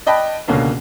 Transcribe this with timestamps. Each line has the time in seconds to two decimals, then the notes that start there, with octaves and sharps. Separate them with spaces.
0.06 D5 D#5 G5 A5 B5 F#6
0.48 C#2 B2 D3 A#3 C#4